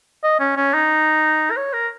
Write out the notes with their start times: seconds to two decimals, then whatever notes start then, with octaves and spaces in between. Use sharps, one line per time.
0.24 D#5
0.40 C#4
0.57 C#4
0.74 D#4
1.51 A#4
1.57 C#5
1.73 A#4